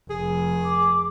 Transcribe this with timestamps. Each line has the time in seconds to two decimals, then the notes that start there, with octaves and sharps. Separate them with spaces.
0.10 F1 G#4
0.64 D6